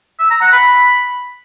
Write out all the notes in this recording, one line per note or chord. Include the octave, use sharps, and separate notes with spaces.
E6
A#5
F#5
B5